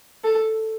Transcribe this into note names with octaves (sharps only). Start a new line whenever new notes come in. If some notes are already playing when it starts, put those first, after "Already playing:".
A4